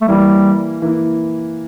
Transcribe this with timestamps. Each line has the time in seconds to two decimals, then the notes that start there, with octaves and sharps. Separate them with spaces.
0.01 A3
0.08 E3 G3 A#3 E4
0.82 E3 A#3 E4